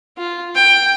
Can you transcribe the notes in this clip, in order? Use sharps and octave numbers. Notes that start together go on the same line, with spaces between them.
F4
G5